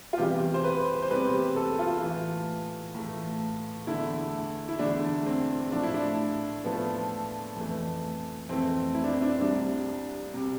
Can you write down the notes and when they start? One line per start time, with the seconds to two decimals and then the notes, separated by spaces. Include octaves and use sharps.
0.13 F4
0.18 E2 C3 E3 G3 G4
0.54 C5
0.64 B4
1.02 C5
1.10 E2 C3 E3 G3 B4
1.33 G4
1.56 A4
1.79 F4
2.03 A2 E3 A3
2.95 A2 E3 A3
3.87 E2 D3 A3 E4
4.69 E4
4.79 E2 D3 A3 D4
5.26 C4
5.72 A2 F3 A3 D4
5.83 E4
5.94 D4
6.64 A2 F3 A3 B3
7.56 F2 E3 A3
8.49 F2 E3 A3 C4
8.95 E4
9.04 D4
9.12 C4
9.22 D4
9.41 C2 C3 G3 D4
10.34 C3 G3